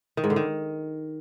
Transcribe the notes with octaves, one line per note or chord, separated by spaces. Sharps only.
D#3
G#2
D3
D#3